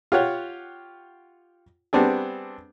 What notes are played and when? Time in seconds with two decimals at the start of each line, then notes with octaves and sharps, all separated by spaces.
0.12 F4 G4 C#5 F#5
1.93 G3 B3 C4 D4 G#4